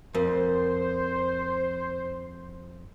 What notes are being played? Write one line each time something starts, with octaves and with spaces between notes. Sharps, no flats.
F2 A#4 C5